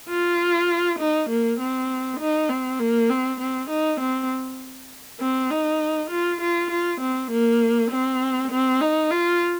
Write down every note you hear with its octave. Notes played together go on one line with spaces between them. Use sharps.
F4
D#4
A#3
C4
D#4
C4
A#3
C4
C4
D#4
C4
C4
D#4
F4
F4
F4
C4
A#3
C4
C4
D#4
F4